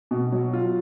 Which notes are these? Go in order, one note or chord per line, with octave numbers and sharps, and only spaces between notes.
B2
F#3
F4